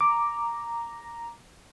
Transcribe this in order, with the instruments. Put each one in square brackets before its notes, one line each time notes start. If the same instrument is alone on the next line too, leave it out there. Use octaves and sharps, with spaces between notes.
[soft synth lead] A#5 [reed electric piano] D6